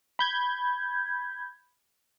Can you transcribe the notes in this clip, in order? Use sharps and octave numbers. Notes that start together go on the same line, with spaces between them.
B5 G6 G#6